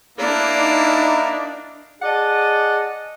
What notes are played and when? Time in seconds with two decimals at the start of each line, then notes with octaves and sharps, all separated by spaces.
0.18 A#3 D4 E4
0.57 D#4
2.02 G#4 D5 D#5 F#5 A5